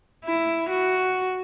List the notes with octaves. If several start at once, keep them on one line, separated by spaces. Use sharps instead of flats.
E4
F#4